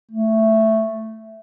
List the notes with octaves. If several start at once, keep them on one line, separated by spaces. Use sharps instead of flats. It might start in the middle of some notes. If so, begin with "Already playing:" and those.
A3